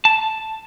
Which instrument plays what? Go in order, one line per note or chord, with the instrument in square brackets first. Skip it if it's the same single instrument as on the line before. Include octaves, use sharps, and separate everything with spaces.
[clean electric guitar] A5